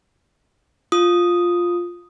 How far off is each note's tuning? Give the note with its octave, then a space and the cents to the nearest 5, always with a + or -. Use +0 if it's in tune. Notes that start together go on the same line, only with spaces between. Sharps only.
F4 +5 D#6 +0